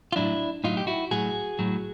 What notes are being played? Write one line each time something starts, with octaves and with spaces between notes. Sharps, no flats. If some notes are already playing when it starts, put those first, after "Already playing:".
F4
A2 F#3 D4 E4
A2 F#3 D#4 F4
G4
E4 F#4
A2 F#3 F#4 G#4
A2 F#3